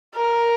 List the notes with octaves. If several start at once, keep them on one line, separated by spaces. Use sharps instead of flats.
A#4